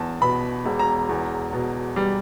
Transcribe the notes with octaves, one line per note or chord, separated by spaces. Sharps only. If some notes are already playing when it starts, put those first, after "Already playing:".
Already playing: E2 A5
B2 B5
E1
A#5
E2
B2
G3